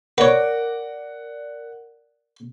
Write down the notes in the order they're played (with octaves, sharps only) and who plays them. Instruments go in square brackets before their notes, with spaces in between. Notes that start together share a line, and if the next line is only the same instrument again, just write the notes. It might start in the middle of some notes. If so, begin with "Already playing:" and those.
[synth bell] A#4 D5 [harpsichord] B4 C#5 [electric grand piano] F#5